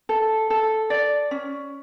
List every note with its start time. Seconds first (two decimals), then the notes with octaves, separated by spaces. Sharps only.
0.09 A4
0.50 A4
0.90 D5
1.31 C#4